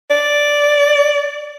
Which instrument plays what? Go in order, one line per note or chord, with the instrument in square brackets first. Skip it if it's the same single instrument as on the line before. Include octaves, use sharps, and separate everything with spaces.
[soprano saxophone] D5